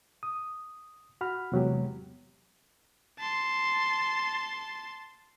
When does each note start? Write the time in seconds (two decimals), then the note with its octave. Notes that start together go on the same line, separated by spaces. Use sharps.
0.23 D#6
1.21 F#4 F#5 B5 F6
1.52 E2 C3 F#3 G#3 B3 G4
3.19 A5 C6